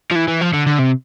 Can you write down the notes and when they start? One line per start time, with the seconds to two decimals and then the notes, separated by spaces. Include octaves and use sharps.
0.11 F3
0.16 E3
0.28 E3
0.41 F3
0.54 D3
0.67 D3
0.79 C3